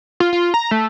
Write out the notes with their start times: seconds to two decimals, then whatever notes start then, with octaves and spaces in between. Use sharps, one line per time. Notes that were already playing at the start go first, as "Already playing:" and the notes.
0.20 F4
0.33 F4
0.54 A#5
0.71 A3